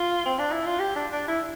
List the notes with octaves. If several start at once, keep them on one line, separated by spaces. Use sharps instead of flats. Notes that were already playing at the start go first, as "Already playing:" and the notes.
Already playing: F4
C4
D4
E4
F4
G4
D4
D4
E4